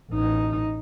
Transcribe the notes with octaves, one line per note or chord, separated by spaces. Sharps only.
A1 D#4